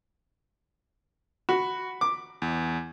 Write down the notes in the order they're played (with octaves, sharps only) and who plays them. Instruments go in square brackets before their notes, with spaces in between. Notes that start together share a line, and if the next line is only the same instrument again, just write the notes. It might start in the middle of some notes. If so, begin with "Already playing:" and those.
[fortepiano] F#4 [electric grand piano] B5
[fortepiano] D6
[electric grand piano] E2